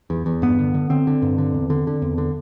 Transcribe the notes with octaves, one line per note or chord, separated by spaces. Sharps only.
E2
E2
G2 B3
D3
D3
D3 C4
D3
G2
D3
E2
D3
D3
E2
D3